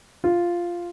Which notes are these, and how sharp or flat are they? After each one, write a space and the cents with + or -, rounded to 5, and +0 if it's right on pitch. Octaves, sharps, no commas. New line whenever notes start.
F4 -5